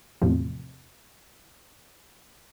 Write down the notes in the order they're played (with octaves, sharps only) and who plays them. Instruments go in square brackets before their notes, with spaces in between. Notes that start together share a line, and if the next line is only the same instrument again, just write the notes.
[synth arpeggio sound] E2 A2 C3 F3